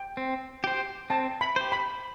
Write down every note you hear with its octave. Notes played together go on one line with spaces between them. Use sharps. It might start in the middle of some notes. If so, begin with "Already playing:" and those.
Already playing: G5
C4
G4 C5
C4 A5
B5
G4 C5
B5